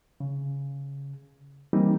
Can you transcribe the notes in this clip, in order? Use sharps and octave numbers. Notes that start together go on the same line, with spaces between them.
C#3
E3 G3 A#3 C4 D#4